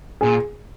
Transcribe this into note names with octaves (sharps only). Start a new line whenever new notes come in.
A#2 G#4